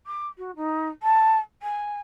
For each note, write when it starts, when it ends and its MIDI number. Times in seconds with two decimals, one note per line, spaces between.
0.06 0.27 86
0.38 0.51 66
0.56 0.88 63
1.03 1.39 81
1.62 2.00 80